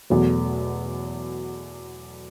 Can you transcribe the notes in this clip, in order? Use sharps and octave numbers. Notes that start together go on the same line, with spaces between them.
E2 B2 F#3 A3